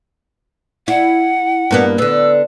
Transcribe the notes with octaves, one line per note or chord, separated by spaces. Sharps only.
E4 F#5
G2 A#3 B3
D3 B3 E6